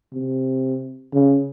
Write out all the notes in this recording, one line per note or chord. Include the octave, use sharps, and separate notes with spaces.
C3
C#3